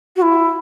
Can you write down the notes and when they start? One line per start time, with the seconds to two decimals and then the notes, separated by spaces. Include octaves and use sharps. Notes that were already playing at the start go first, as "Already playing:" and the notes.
0.16 F#4
0.22 E4